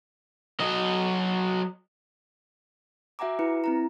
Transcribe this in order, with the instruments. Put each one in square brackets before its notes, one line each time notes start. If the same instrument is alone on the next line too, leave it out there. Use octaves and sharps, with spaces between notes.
[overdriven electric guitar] F#3 D#5
[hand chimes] F#4 E5 F#5 G#5 A#5 D6
E4 B4 C#7
C4 E4 A#5